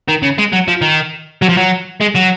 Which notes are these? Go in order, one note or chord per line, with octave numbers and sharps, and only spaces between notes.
D#3
C#3
G#3
F#3
F3
D#3
F#3
F3
F#3
G#3
F#3